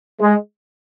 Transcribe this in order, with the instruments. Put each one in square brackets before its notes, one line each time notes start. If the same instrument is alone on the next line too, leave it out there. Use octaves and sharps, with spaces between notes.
[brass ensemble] G#3